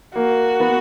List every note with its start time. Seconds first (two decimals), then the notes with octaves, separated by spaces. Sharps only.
0.15 A#3 F#4
0.60 B3